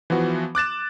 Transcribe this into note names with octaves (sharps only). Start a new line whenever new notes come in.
E3 F3 B3 F#4
D6 F#6 A6 E7